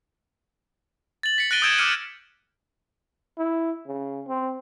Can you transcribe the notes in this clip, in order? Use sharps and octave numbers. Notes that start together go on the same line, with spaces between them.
A6 F#7
B6 C#7
F#6 A6 A#6 D7 D#7 G7
D#6 E6 G6 G#6 D7 E7
D6 E6 F6 C#7 D#7
E4
C#3
C4